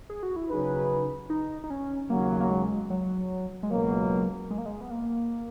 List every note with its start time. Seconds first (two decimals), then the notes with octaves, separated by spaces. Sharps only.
0.10 G#4
0.23 F#4
0.36 E4
0.50 C#3 F#3 C#4 D#4 G#4 B4
1.30 D#4
1.64 D#4
1.70 C#4
2.10 D#2 C#3 F#3 A#3
2.40 A#3
2.50 G#3
2.90 F#3
3.63 G#3
3.70 C#2 B2 F#3 A#3
4.51 G#3
4.58 A#3
4.66 G#3
4.81 B3
4.90 A#3